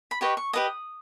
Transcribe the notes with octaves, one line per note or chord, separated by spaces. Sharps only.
B5
G4 B4 D#5 C#6
C#6
G4 B4 D#5 D#6